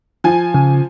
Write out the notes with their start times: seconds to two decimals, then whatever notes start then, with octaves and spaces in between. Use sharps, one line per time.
0.24 F3 G#5
0.54 C#3